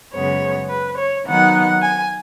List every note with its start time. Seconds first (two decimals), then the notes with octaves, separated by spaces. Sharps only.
0.13 F#2 C#3 G#3 B3 C#5
0.69 B4
0.97 C#5
1.25 D#3 F#3 B3 D#4 F#5
1.81 G#5